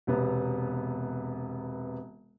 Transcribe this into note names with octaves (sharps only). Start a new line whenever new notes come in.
E1 C3 B3